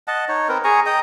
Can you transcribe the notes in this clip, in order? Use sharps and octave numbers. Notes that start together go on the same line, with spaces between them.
D#5 F#5 A5
D#4 C#5
C4 A#4 B4
G#4 G#5 A#5 C#6
D#5 G5 A#5 D#6